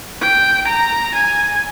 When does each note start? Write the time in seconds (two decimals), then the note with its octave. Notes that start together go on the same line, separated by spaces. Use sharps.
0.21 G5
0.67 A#5
1.15 G#5